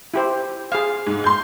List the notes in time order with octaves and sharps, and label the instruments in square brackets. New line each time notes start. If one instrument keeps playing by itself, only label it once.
[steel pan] E4 G4 C5
G#4 F5
[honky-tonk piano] G#2
C6 G6